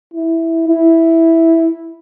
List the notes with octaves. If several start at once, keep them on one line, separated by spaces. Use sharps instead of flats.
E4
E4